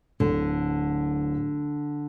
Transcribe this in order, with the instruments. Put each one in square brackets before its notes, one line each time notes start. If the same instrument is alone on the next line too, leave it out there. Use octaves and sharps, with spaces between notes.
[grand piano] D1 [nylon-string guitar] D3